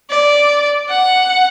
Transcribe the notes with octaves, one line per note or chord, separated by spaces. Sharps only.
D5
F#5